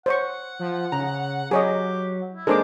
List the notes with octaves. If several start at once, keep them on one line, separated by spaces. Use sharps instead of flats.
C5 C#5 F#5 C#6
F3
C#3 A#5
F#3 G4 G#4 C#5 D#5
E4
G#3 A#3 D4 A4 C5 D6